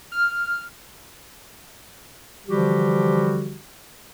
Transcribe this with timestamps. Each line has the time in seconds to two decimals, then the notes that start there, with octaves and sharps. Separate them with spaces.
0.12 F6
2.47 D3 E3 F3 G3 F#4 G4